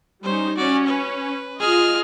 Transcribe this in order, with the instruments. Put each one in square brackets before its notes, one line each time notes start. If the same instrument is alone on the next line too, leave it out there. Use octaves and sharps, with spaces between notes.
[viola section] G3 C#4 D#4 [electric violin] C5
[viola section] C#4 [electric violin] F#4 D5
[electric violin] B4
[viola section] F4 D#5 [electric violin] G#4 F6